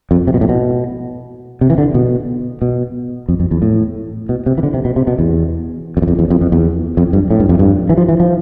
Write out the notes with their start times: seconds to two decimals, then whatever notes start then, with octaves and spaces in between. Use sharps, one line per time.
0.11 F2
0.27 C3
0.34 B2
0.41 A2
0.49 B2
1.61 C3
1.70 E3
1.78 D3
1.94 B2
2.62 B2
3.29 F2
3.40 F2
3.51 E2
3.62 A2
4.29 B2
4.46 C3
4.58 E3
4.63 D3
4.74 C3
4.85 B2
4.96 C3
5.07 B2
5.19 E2
5.97 F2
6.02 E2
6.08 F2
6.19 E2
6.30 F2
6.41 F2
6.52 E2
6.97 F2
7.13 G2
7.30 A2
7.40 G2
7.49 F2
7.59 G2
7.90 E3
7.98 F3
8.09 E3
8.20 F3